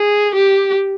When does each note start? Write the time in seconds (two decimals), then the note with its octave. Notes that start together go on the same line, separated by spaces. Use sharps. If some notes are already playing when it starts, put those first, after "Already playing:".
Already playing: G#4
0.35 G4